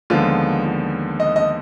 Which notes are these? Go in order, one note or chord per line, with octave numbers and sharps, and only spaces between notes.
D#2 D3 F3 G#3 B3 F4
D#5
D#5